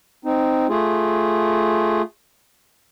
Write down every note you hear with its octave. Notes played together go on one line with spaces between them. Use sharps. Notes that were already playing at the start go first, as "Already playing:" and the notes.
C4 D#4
A3 F4 G#4